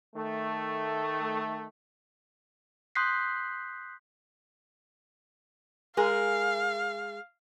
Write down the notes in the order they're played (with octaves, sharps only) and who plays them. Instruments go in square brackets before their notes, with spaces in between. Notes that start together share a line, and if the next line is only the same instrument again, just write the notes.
[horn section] D#3 A3
[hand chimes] C6 D#6 F#6 G6 B6 C7
[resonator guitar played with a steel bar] G#3 G#4 A#4 [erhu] F5